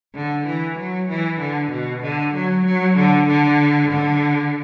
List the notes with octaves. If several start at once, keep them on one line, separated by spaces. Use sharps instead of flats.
D3
E3
F#3
E3
D3
B2
D3
F#3
F#3
D3
D3
D3